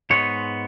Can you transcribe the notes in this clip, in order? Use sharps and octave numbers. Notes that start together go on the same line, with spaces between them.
G#2 G#3 B3 C#5